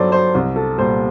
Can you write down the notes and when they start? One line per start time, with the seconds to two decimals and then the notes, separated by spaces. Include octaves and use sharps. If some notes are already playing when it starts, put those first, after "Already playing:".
Already playing: G2 F#3 A4 C5 D5
0.12 C5
0.35 C2
0.56 A4
0.78 A#2 G3 C5